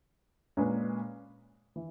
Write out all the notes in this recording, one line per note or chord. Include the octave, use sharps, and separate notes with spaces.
A#2 G#3 C#4 G#4 B4
E3